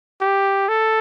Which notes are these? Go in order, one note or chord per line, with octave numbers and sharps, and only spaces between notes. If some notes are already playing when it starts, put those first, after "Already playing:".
G4
A4